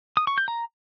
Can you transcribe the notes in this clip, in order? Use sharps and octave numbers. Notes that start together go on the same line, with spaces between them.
D#6
C#6
G6
A#5